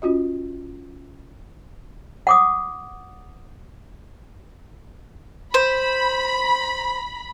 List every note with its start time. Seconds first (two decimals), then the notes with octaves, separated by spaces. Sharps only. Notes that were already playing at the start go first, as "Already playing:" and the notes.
0.02 C#4 F4 F#4 D#5
2.27 F#5 D6 D#6
5.54 C5 B5